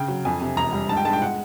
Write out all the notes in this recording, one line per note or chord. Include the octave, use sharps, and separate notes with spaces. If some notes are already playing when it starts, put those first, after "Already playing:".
Already playing: C#3 G5
F#3
F2 G#5
C3
E1 A#5
G3
G#2 A5
G5
G#3 A5
G5
F#5